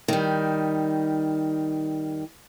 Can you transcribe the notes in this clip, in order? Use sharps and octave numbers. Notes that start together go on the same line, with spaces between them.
D#3 G3